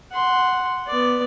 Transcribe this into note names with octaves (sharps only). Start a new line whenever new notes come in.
F#5 C6
B3 D5